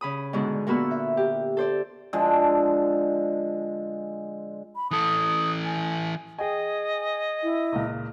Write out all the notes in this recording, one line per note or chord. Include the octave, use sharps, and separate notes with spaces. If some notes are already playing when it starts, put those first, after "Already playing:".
C#3 B5 D#6
G#2 B2 D3 G#3
A#2 A#3 B3 F#4 B5 E6
E5
G4
A4 C5 D5
D3 F3 G#3
B5
E3 A4 D#6
G#5
G#4 D#5 G5 G#5
E4
C#2 A#2